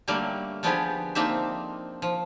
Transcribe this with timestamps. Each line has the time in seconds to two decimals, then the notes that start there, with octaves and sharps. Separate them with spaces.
0.08 D3 F#3 G3 A3 A#3
0.63 D3 F3 B3 D4 G4 G#4
1.15 F3 A#3 C4 D4 D#4 E5
2.02 F3